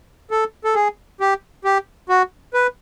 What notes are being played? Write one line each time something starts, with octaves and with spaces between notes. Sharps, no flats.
A4
A4
G#4
G4
G4
F#4
B4